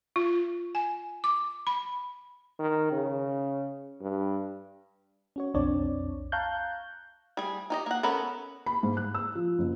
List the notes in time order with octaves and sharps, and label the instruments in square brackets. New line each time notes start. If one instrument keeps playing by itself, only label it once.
[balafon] F4
G#5
D6
B5
[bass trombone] D#3
C#3
G2
[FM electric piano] C#4 F#4 C#5
B1 F2 C4 D4 C#5 D5
F5 A5 A#5 C#6 F#6 G6
[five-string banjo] G3 G#4
D#4 G4 D#5
A#3 F#5
B3 C#4 A4 A#4 B5
[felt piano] B5
G#2
F#6
E6
F3
F#1